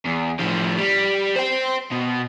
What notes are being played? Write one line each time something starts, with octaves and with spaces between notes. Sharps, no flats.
E2
A2 F3
G3
C5 G5
B2